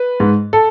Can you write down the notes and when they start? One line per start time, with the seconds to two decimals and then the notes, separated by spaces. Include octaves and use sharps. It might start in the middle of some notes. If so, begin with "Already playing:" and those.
Already playing: B4
0.20 G#2
0.53 A4